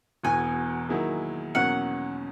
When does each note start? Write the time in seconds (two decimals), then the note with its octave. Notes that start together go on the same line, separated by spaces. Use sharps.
0.23 E1 E2 B2 G#5
0.89 D#3 F#3 A#3 E4 G#4
1.54 E2 B2 F#3 A#3 C#4 F#5